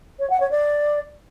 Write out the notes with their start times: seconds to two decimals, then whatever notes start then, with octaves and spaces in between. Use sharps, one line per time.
0.20 C#5
0.30 F#5
0.40 C#5
0.51 D5